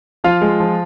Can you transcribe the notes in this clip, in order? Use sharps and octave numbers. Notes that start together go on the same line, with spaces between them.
F3 F4 F5
G#3
F3